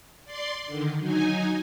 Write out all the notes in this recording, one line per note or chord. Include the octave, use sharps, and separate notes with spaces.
D5 C6
D3 D#3
F#3 D#4 G#5